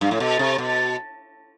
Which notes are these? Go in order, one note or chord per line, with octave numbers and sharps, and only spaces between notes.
G2
A2
B2
C3
B2